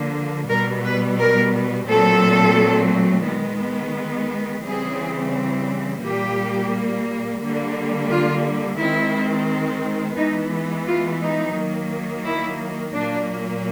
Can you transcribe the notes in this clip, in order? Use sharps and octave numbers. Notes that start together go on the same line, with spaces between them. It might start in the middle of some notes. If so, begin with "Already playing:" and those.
Already playing: D3 F3 A#3
B2 G3 B3 A#4
B4
A#4
A#2 F#3 A3 C4 A4
D#3 G#3 B3
C#3 E3 G3 C4 G#4
A#2 G3 A#3 G4
D3 G3 A#3
F4
D#3 G#3 C4 E4
E3 G#3 B3 D#4
F4
D#4
D#3 F#3 A#3
E4
A#2 F#3 A#3 D4